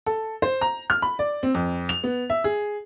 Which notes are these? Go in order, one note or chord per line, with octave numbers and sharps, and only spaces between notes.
A4
C5
A#5
F6
B5
D5
C4
F2
F7
B3
E5
G#4